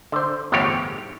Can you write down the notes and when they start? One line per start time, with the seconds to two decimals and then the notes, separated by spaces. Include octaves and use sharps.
0.12 D3 C5
0.52 G1 E2 A2 F3 G4 C#5